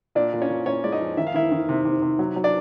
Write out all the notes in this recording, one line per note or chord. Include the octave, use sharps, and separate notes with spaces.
A#2 D4 D5
A#2
C#4 C#5
A#2
A#2 C#4 C#5
G#3 D5
D#4 D#5
F3
D#3 E5
F5
D#3 E4 E5
D#3
C3
C3
C3
F#3
F#3
D4 D5